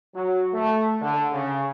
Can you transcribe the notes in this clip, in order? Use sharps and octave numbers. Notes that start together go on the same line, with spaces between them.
F#3
A3
D3
C#3